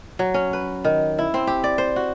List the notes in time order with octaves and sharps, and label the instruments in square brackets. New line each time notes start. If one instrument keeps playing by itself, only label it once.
[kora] F#3
C#4
B4
D#3
E4
C4
G4
D5
C5
F#4